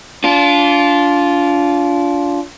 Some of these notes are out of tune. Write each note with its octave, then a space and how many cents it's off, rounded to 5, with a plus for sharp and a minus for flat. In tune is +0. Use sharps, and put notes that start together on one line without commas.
D4 -30 F4 +0